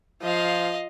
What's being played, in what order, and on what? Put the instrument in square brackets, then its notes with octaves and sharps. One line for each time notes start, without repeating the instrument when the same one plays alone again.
[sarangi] F3 [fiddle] D#5 F5